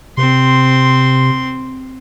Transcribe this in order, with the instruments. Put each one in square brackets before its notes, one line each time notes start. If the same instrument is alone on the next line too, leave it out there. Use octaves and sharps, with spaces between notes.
[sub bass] C3 [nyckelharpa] C4 C6